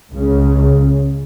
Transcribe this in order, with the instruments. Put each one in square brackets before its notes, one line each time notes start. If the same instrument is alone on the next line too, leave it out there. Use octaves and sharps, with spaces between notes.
[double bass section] C#2 C#3